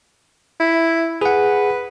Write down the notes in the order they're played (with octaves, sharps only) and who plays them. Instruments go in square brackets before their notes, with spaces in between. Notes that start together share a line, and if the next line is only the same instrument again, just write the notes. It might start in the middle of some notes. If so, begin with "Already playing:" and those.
[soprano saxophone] E4
[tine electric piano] G#4 F#5 [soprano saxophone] B4